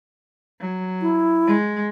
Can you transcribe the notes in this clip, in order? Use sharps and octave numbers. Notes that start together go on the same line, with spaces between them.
F#3
E4
G#3